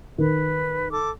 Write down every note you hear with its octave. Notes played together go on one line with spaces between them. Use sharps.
D#3 B4
A4 D6